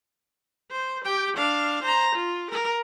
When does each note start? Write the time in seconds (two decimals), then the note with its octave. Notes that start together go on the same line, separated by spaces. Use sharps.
0.71 C5
1.04 G4 G5
1.37 D4 F5
1.83 C5 A#5
2.15 F4
2.51 A#4